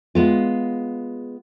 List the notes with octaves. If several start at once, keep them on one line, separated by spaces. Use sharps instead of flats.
G#3 B3 F4